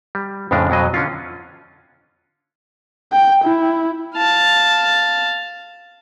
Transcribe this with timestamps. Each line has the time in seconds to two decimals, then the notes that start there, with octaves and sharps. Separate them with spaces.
0.15 G3
0.51 F2 A2 C#3 G#3 D4
0.70 F2 B2 F#3 D#5
0.94 D3 C#4 F4
3.13 G5
3.44 E4
4.16 F5 A5